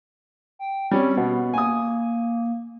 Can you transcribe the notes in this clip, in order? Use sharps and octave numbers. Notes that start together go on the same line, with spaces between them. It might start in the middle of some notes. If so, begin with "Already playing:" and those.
G5
G3 C4 C#4
B2 B3
A#3 G#5 D#6